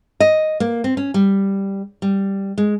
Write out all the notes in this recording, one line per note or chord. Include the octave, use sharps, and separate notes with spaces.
D#5
A#3
C4
C#4
G3
G3
G#3